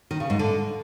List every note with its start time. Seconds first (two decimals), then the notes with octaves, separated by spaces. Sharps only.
0.11 D#3
0.20 C#3
0.30 G#2
0.39 D3